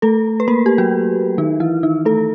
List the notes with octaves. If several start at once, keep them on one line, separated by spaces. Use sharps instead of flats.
A3 A4
B4
A#3 A#4
G4
F#3 F#4
D#3 D#4
E3 E4
D#3 D#4
A3 A4